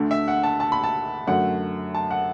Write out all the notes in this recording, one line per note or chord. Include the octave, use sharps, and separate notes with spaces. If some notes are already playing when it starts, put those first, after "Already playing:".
Already playing: D2 D3 A3
E5
F#5
A5
A5
B5
A5
F#2 D3 F#3 A3 F#5
A5
F#5